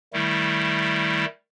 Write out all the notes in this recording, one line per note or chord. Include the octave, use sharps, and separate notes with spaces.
D#3 G3 A3 E4